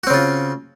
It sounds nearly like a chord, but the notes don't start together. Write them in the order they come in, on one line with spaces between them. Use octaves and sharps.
F#4 C4 C#3 F4